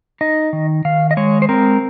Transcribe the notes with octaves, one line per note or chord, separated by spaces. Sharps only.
D#4 D#5
D#3
D#3 F5
D#5
G#3 C#5
C5
C4 A#4